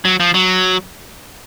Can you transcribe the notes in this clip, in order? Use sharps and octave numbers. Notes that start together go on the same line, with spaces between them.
F#3
F3
F#3